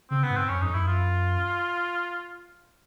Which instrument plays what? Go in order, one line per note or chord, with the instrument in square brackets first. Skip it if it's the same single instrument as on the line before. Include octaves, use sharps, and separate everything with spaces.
[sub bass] C#3 [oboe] C4
[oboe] B3
[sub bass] G#2
[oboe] C4
[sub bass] F#2 [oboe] C#4
[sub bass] F2 [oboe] D#4
[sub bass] F#2 [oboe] E4
[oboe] F4